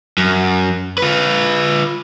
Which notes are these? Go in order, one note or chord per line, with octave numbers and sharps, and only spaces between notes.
F#2
F4 B4